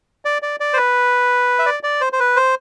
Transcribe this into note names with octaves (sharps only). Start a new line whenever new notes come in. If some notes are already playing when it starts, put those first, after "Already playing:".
D5
D5
D5
C5
B4
E5
D5
D5
C5
C5
B4
C5